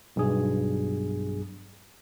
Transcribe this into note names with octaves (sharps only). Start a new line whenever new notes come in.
B1 G2 G#4